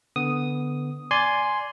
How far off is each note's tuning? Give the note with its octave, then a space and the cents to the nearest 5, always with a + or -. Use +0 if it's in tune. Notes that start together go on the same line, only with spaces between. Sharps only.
D3 -5 B3 +5 D#6 +0
D5 -10 G#5 +5 C6 +0